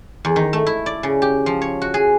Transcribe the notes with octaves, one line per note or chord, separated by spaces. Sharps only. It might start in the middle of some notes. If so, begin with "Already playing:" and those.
E2
D#3
A3
E4
D5
C#3
G4
F3
C#5
F#4
G#4